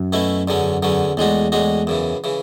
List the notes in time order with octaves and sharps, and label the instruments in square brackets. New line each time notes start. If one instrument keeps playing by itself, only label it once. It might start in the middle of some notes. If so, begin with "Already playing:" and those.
Already playing: [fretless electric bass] F#2
[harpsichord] B2 A3 C#4 E4
E2 D3 F#3 C#4
E2 D3 F#3 C#4
[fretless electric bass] E2 [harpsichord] A2 G#3 D4 F#4
[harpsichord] A2 G#3 D4 F#4
F#2 C#3 E3
C#3 E3